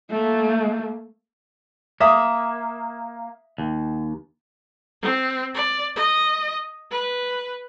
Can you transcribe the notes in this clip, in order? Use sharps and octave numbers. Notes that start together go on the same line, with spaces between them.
A3 A#3
A#3 E5 D#6
D#2
C4
D5
D#5
B4